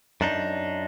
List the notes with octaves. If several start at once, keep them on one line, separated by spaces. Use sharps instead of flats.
F#2 D4 D#4